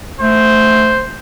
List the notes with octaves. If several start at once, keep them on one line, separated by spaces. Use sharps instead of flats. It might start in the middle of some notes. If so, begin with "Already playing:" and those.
A3 C5